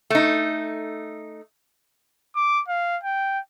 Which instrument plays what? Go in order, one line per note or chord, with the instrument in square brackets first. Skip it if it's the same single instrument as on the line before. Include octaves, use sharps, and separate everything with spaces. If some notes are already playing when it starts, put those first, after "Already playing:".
[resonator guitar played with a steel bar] A3 D#4
[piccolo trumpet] D6
F5
G5